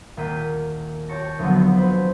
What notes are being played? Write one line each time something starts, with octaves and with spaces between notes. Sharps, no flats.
D#1 A#3 G5 B6 D#7
G4 C#5 A5 C#6 A#6
F1 D2 F3 F#3 B3
B4 C5